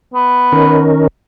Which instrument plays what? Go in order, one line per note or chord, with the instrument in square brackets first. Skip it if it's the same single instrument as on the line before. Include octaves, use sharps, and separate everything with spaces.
[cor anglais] B3
[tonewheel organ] D#3 C#4 A#4